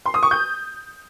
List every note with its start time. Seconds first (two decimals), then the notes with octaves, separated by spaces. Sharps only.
0.06 C6
0.14 D#6
0.23 C#6
0.31 G6